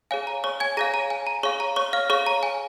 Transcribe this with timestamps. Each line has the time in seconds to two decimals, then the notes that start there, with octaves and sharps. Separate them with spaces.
0.11 G#4 C#5 F5 G#5
0.27 A#5
0.44 C#5 C#6
0.60 G#5 G#6
0.77 G#4 C#5 F5 A#5 A#6
0.94 A#5
1.10 G#5
1.27 A#5
1.43 G#4 C#5 F5 C#6
1.60 A#5
1.76 C#5 C#6
1.93 F5 F6
2.10 G#4 C#5 F5 C#6
2.26 A#5
2.43 G#5